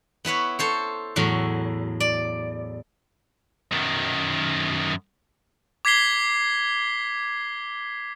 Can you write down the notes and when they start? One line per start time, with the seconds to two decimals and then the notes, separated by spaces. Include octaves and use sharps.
0.25 B3 E4 B4 C#5
0.59 A4 C5 C#5
1.16 E2 A2 F#3
2.00 D5
3.72 F#2 D#3
5.85 D6 G#6 B6 C7 G7